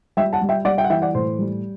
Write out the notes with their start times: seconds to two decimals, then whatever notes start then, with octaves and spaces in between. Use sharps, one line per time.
0.17 G3 E5 G5
0.33 F#5 A5
0.41 G3
0.49 E5 G5
0.65 G3 D5 F#5
0.78 E5 G5
0.84 F#5
0.90 E3 E5 G5
1.02 D5 F#5
1.15 A2 C5
1.39 G3